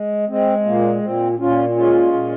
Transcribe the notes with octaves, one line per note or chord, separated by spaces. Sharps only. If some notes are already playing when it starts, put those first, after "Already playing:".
Already playing: G#3
G#3 C4
A#2 A#3
A#2 C4
A#2 C#4 F4
G#3 C#4 F4
A#2